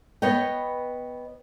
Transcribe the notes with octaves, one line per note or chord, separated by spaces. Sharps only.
B3 B4 C#5 D#5 G5